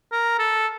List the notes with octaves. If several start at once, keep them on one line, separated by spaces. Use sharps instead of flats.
A#4
A4